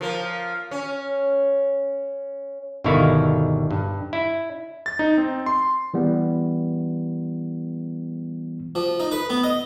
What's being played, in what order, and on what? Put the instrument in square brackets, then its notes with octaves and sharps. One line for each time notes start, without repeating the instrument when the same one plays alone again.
[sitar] F3 A#3
C#4
[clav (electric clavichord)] G1 B2 D3 D#3 E4 F5
G2
E4
[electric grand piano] A6
D#4
C4
C6
[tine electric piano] E3 G3 B3
[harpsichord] F3
D#4
B4
B3
D#5